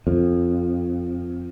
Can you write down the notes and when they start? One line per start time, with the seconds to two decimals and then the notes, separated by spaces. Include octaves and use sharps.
0.07 F2